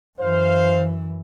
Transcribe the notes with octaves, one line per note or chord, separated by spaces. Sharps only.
F#2 E3 C5 F5